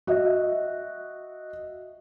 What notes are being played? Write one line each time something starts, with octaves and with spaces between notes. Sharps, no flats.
F#4 D#5 E5